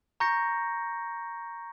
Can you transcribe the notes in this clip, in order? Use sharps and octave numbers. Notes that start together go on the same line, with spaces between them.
A#5 C#6 G6 A#6 C#7